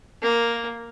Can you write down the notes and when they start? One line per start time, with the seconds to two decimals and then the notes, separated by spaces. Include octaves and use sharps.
0.22 A#3